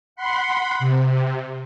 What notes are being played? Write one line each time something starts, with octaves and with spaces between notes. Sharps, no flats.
F#5 B5 C6
C3